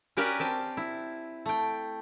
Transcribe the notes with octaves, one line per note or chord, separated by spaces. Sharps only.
C#4 F#4 G4 A#4 B4 D5
C4 G5 A5
E4
A3 G5